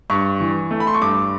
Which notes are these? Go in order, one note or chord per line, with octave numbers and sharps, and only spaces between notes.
G2 C#6
E3
A3
B5
C6
C#6
G2 D6